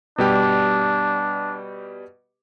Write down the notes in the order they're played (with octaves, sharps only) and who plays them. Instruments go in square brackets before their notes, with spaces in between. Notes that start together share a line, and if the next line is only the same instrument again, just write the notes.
[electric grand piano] B2 G3 G4 [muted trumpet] D4